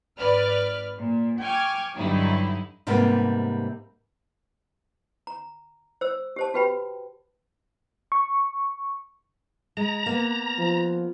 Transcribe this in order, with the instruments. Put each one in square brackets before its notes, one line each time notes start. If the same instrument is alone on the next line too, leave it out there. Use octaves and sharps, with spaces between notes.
[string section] G#1 B4 D5 F6
A#2
G5 G#5 C#6 D6 F6 G#6
G2 D3 F#3 D#4 E4
[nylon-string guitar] G#2 C3 G3 G#3 A#3 B3
[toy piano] A#5
C5 E6
G4 C5 A5
F#4 G4 B4 G5 B5
[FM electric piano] C#6
[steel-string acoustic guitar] G#3 [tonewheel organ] A#5
[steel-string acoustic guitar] A#3 B3
[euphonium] F3